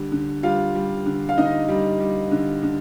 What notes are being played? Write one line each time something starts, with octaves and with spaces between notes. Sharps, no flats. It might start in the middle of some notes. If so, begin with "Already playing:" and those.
Already playing: D3 G3
D3
G3 F4 F5
G3
D3
F5
D3 D#4 D#5
G3
G3
D3
D3